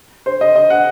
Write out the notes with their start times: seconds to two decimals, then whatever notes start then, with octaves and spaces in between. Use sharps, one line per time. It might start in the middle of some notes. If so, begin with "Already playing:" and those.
0.26 C5
0.41 D#5
0.56 D#5
0.70 F#5